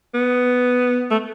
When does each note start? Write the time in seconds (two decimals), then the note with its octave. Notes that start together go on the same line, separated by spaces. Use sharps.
0.14 B3
1.11 A3